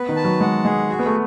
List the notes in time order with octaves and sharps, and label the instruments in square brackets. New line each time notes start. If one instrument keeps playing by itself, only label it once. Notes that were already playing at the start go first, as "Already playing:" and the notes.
Already playing: [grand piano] B3 [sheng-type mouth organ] B4
[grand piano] D#3
[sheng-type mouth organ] A5
[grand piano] F#3
[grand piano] G#3 [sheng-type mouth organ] F#5
[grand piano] G#3 [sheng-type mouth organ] G#4
[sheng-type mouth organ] F#4
[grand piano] B3
A3